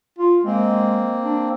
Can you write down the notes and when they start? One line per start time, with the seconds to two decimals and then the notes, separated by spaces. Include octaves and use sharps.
0.19 F4
0.44 G#3 A#3 C4
1.24 D4